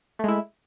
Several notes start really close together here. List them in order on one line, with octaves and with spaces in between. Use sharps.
A3 G#3 E4